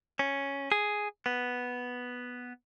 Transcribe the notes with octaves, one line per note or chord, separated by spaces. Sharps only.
C#4
G#4
B3